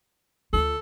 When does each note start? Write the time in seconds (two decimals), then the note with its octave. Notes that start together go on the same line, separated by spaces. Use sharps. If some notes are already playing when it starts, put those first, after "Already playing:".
0.53 D2 F4 A4